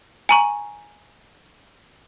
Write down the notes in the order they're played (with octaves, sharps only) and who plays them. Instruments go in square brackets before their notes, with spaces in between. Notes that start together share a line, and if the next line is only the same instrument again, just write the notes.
[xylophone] G#5 A#5 C#6